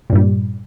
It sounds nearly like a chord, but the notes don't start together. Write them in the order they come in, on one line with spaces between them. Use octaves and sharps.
A#2 G2 G3